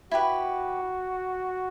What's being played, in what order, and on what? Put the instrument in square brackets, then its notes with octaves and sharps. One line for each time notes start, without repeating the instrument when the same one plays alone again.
[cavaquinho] E4 G4 B4 [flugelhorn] F#4